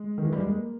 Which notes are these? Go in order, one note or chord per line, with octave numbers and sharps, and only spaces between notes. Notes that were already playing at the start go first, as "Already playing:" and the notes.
Already playing: G#3
D#3
E3
G3
G#3
A#3